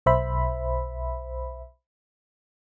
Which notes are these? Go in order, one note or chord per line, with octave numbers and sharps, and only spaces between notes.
B1 C5 E5 B5